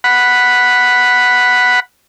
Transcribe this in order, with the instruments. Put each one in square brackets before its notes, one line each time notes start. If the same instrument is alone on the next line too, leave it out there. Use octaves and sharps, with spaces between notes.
[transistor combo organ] F#5 B5